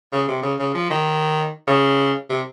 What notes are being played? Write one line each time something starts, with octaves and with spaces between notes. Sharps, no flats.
C#3
C3
C#3
C#3
F3
D#3
C#3
C3